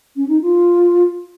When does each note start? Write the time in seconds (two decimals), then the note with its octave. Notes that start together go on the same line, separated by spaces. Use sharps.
0.16 C#4
0.28 D#4
0.42 F4